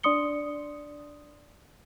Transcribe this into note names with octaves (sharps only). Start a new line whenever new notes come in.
D4 D5 C6 D#6 C#7 G7